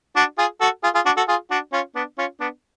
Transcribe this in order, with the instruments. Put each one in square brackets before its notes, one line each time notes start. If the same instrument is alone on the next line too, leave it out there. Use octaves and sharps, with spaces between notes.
[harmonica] D4 F#4
F4 G#4
F#4 A4
F4 G#4
F4 G#4
D4 F#4
F#4 A4
F4 G#4
D4 F#4
C#4 F4
B3 D4
C#4 F4
B3 D4